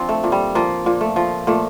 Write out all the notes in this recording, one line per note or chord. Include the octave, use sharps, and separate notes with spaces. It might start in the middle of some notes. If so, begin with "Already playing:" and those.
Already playing: F3 C4 D4
A3
A#2
G3
F3 A#3
A#2
A3
F3
A#2 A3